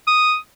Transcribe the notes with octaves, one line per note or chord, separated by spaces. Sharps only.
D#6